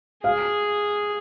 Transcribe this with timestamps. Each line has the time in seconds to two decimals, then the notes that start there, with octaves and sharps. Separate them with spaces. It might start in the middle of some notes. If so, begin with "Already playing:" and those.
0.24 G#4 F5